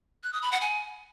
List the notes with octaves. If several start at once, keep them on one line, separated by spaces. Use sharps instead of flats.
F#6
D#6
B5
F#5
G#5